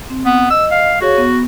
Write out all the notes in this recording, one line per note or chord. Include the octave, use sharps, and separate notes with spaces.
C4
B3
D#5 E6
F5
F#4 G#4 C#5 F5
B3